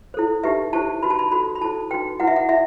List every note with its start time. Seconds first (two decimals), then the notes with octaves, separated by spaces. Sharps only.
0.14 E4 A4 C5
0.44 D#4 G4 B4 E5
0.73 E4 G4 C5 A5
1.03 D#4 F#4 B4 B5
1.10 A5
1.19 B5
1.32 F#4 A4 C5 B5
1.56 B5
1.61 E4 A4 C5 A5
1.91 D#4 F#4 B4 G5
2.20 E4 B4 F#5
2.27 E5
2.36 F#5
2.49 E4 E5